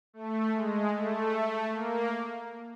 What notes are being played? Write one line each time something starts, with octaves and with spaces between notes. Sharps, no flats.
A3
G#3
A3
A#3